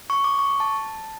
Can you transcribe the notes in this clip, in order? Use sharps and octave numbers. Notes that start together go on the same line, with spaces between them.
C#6
D6
C#6
A5